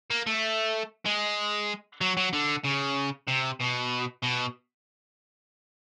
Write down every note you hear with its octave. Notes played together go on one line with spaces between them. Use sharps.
A#3
A3
G#3
F#3
F#3
D3
C#3
C3
B2
B2